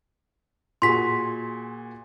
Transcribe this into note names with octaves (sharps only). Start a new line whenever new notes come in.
A#2 F#4 G#4 C6 B6